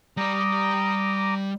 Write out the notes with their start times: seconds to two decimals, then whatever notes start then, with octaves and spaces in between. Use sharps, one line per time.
0.17 G3 D5 A#5 D6 D#6